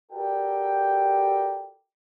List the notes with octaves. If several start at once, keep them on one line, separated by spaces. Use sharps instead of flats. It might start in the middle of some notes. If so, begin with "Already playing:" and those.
F#4 G4 A4 A#4 D5 G5